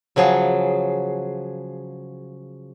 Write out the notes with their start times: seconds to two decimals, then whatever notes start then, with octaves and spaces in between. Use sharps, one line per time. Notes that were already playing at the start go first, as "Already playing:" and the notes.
0.16 C#3 F3 F#3 G#4